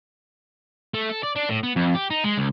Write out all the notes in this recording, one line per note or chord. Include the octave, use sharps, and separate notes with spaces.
A3
A4
D5
D4
A2
B3
F2
G4
D#4
G#3
C#2